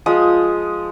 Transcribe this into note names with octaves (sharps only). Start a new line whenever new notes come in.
F3 G#3 D#6